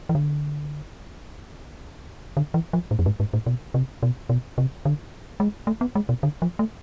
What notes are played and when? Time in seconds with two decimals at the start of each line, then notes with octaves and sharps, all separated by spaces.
0.09 E3
0.15 D3
2.37 D3
2.54 E3
2.73 F3
2.91 A2
2.99 F2
3.06 G#2
3.20 G#2
3.33 A2
3.46 B2
3.74 C3
4.03 B2
4.29 B2
4.58 C3
4.85 D3
5.40 G#3
5.67 A3
5.81 B3
5.95 G#3
6.09 B2
6.23 D3
6.42 F3
6.59 A3